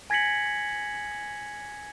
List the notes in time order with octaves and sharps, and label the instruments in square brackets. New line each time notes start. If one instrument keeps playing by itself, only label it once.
[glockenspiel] G#5 G#6 A#6 B6 C#7 F#7